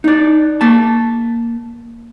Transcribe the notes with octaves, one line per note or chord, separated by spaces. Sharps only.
D#4 D5
A#3 A5